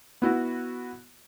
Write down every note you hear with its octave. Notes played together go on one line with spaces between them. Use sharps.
B3 E4 F#4